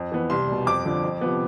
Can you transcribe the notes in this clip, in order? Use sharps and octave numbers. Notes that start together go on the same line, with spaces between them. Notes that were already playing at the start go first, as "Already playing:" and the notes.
Already playing: F2
E3 B3
C2 C6
B2 G3
F2 D6
D3 F3
F2
C3 F3 B3